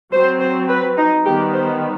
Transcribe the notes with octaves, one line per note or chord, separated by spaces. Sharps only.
F#3 C4 C5
C5
B4
D#4
D#3 G3 B3 G4
C5